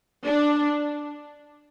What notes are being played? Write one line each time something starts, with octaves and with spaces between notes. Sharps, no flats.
D4